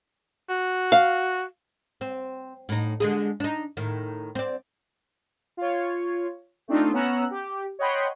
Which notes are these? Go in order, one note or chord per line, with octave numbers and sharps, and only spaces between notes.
F#4
F5
C4
A2 D#4
D3 G#3 G#4
D4 D#4
A2 D#3
C4 D5
F4 C#5
A3 C4 D4 D#4 F4
B3 C#4 F#5 A#5 E6 F#6
G4
C#5 D#5 F#5 G5 B5 C6